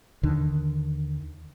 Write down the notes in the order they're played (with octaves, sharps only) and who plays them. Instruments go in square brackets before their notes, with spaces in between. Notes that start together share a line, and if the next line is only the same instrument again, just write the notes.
[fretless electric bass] D#2 D3 D#3